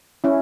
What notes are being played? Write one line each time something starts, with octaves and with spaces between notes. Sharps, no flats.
C#4 E4